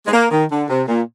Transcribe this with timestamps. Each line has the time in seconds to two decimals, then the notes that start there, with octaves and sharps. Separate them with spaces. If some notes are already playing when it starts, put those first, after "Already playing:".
0.06 G#3
0.12 A#3
0.30 D#3
0.50 D3
0.69 C3
0.87 A#2